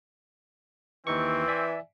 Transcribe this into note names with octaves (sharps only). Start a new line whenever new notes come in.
D#2 E3 C4 D#4 C#6
D5 E5 G#5